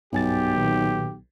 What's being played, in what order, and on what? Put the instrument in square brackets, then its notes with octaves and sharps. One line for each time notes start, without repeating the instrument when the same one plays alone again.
[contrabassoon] B1 [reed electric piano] G2 G#5 A6 [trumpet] G4
[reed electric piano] A#2 D#3 B3